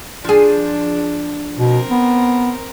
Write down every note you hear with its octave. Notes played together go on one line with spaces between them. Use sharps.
F3 D4 G#4
B2 C4 A#4
B3